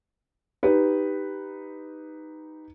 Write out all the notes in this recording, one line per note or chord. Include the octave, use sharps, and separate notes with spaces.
D#4 G4 B4